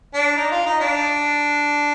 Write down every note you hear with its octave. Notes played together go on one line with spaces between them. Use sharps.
D4
D#4
F4
D#4
D4